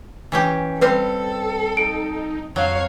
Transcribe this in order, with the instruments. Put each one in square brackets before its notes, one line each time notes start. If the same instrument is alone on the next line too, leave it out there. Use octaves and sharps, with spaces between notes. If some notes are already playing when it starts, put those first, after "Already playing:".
[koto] E3 C#4 G4
[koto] G3 C4 F5 [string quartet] A4 [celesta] B4
[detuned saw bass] D#4 [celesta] D7
[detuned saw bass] F2 [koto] F#3 [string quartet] C#5 F5